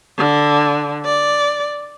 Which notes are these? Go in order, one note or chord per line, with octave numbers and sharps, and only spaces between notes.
D3
D5